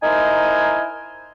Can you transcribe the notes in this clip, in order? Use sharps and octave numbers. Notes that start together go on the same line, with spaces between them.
D#4 E4 A#4 C5 G#5